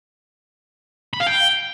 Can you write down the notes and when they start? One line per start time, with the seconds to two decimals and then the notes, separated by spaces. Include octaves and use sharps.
1.14 B5
1.20 F5
1.27 G5